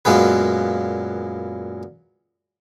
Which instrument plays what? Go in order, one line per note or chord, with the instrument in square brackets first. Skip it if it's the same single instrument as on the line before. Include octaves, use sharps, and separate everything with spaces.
[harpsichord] F#2 A#2 G#3 B3 B4